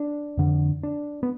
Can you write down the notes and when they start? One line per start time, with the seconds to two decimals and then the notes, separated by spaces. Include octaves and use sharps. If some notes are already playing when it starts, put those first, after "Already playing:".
Already playing: D4
0.37 F2 D3
0.83 D4
1.23 B3